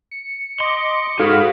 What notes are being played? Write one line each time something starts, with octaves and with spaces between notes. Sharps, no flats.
C#7
D#5 C6 D6
D#4 F#4 G#4 A4 F5 B5 D#6 F6